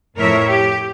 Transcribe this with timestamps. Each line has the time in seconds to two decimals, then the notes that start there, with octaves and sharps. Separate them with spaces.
0.16 F2 A2 A#4 C#5 E5
0.47 G4